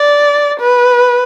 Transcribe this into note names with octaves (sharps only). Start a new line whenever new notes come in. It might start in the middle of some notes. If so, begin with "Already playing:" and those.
Already playing: D5
B4